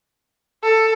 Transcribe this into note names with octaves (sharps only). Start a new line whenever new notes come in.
A4